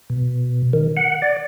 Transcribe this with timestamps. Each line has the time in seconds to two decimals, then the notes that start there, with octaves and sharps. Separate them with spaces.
0.10 B2
0.73 D#3
0.97 F#5
1.22 D5